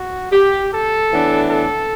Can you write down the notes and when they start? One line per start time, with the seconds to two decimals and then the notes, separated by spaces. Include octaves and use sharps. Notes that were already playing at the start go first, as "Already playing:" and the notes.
Already playing: F#4
0.32 G4
0.72 A4
1.11 A2 E3 B3 D4
1.51 A4